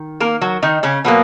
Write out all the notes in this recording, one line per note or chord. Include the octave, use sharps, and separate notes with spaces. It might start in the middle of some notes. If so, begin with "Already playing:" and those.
Already playing: D#3
A#3 A#4
F#3 F#4
D#3 D#4
C#3 C#4
B2 F#3 A#3 B3